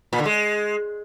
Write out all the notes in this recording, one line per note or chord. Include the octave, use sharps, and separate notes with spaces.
A#2
D3
G#3